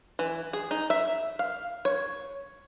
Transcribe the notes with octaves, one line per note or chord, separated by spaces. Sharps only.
E3
G#4
D#4
E5
F5
C#5